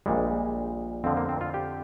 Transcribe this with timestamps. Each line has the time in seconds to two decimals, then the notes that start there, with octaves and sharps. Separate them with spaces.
0.06 A#1 A#2 G3 G#3
1.04 F2 D3 F3 C4
1.17 A#3
1.29 C4
1.41 F4
1.54 G4